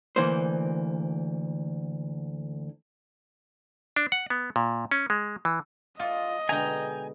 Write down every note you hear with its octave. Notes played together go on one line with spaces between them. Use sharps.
D2 G2 E3 A#3 C5
D4
F#5
B3
A#2
C#4
G#3
E3
F4 A4 D5 D#5
B2 D3 G#3 G5 G#5 A#5